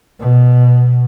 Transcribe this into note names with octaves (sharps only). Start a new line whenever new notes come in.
B2